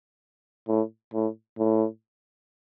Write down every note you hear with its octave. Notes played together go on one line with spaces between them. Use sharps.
A2
A2
A2